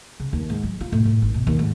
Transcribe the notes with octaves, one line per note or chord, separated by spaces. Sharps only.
C#3
D#2
G#2
F#3
F4
A2
A2
G#1
B2
D#2
G#2